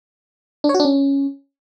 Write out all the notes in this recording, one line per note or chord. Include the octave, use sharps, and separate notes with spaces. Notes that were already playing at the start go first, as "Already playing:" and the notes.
D4
C#5
F#4
D4
C#4